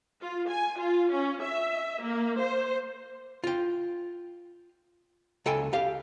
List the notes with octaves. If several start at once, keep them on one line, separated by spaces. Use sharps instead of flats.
F4
G#5
F4
C#4
E5
A#3
C5
F4 G5
C#2 A4 G5 G#5
G4 F5